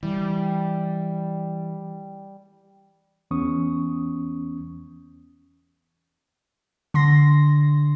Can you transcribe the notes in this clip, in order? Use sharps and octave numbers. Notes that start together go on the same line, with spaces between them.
E3 G3
E2 E3 B3 C#4 C#6 D#6
D3 C6 A#6